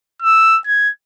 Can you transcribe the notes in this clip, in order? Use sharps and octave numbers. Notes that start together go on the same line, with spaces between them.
E6
G#6